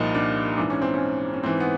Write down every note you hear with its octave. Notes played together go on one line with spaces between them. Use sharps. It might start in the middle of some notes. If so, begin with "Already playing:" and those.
Already playing: C2 A#2 F3 D#4
D4
G#2 E3 D4
C#4
C4
C#4
C#4
G#2 E3 C4
B3